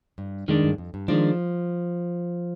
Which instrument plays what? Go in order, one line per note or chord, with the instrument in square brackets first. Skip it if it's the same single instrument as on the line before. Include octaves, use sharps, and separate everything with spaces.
[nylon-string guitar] G2
[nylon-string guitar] F2 [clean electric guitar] D#3 G#3 D4
[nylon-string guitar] G2
F2
G2
[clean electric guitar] D#3 G#3 D4 [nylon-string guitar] F3